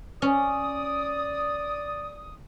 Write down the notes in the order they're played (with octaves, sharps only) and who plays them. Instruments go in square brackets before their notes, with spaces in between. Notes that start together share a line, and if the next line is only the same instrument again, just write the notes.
[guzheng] C#4 [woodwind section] D5 D#6